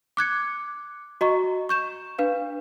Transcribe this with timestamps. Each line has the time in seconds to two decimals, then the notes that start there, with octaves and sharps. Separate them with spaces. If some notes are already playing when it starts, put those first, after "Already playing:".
0.17 D6 F#6 G#6 C#7
1.21 F#4 D#5 A#5 C#6
1.69 C#6 G6 E7
2.19 D4 B4 F5